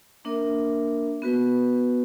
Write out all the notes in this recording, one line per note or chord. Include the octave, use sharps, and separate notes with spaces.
A#3 D4 A#4 E5
B3 F#4 B4